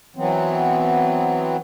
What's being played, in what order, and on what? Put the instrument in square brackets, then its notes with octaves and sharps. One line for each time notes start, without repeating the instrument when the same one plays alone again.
[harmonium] E3 F#3 B3 C4